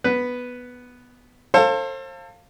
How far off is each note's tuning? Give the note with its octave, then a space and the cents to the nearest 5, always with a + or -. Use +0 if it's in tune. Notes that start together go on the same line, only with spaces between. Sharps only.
B3 +0 B4 +0
A4 +30 C5 +35 F5 +0